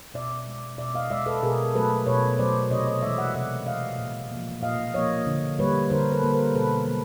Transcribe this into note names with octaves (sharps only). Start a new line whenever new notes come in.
B2 D5 E5
G#3
B2 D5 E5
D#5 F5
G#3 D5 E5
A4 B4
B2 G#4 A#4
A#4
F#3 A3 A4 B4
B2 B4 C#5
F#3 A3 C5 D5
C3 C#5 D#5
C#5 D#5
E3 G#3 D5 E5
E5 F#5
C3 E5 F#5
E3 G#3 D#5 F5
A#2
F3 A#3
A#2 D#5 F5
F3 A#3 C#5 D#5
D3
G3 A#3 B4 C#5
D3 A#4 C5
A4 B4
G3 A#3
A#4 C5
B2 A4 B4
F#3 A#3